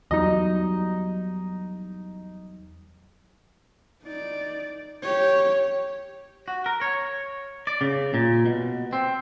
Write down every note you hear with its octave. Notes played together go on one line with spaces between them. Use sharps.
E2 F#3 G3 D#4 D#5
D#4 D5
G4 C#5
F#4
A#4
C#5
D5
C#3
A#2
B2
C4